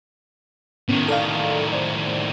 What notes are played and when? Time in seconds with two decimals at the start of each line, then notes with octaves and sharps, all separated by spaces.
0.89 A2 D#3 B3 C#4
1.08 A4 D5 F5
1.73 C5 D5